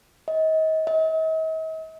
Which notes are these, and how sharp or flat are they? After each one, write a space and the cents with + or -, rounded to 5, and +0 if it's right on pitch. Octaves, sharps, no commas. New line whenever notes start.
D#5 +30
D#5 +45